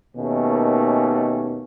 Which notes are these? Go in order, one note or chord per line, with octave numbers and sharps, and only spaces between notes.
D#2 B2 D#3 A3 A#3 C#4